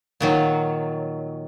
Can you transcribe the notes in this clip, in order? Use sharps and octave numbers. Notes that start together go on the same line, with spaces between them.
A#2 D#3 F#3